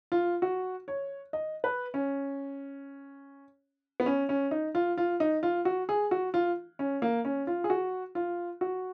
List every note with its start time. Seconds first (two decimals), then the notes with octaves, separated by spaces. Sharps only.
0.12 F4
0.42 F#4
0.88 C#5
1.33 D#5
1.64 B4
1.94 C#4
4.00 B3
4.06 C#4
4.29 C#4
4.51 D#4
4.75 F4
4.98 F4
5.20 D#4
5.43 F4
5.65 F#4
5.89 G#4
6.11 F#4
6.34 F4
6.79 C#4
7.02 A#3
7.25 C#4
7.47 F4
7.64 G#4
7.70 F#4
8.15 F4
8.61 F#4